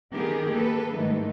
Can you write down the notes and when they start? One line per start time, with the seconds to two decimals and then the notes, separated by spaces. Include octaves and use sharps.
0.11 D#3 B3 G4 G#4 A#4
0.50 A#3 A4 B4
0.94 G#2 D#3 E3 G3 A3